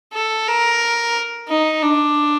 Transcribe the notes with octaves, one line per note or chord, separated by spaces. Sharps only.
A4
A#4
D#4
D4